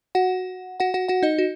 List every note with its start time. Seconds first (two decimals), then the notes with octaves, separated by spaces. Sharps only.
0.15 F#4 F#5
0.80 F#4 F#5
0.94 F#4 F#5
1.08 F#4 F#5
1.23 D#4 D#5
1.38 F#4